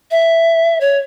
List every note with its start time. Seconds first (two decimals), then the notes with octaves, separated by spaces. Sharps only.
0.11 E5
0.81 C#5